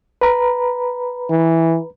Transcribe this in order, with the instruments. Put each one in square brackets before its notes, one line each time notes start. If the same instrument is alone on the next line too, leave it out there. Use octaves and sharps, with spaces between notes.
[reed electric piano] B4 A#5 B5
[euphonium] E3